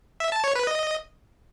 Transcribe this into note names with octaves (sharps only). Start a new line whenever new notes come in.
E5
A5
C#5
B4
D#5